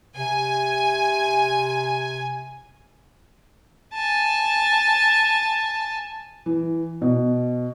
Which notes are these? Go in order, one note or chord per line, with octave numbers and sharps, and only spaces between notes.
C3 G#5
G#5 A5
E3
B2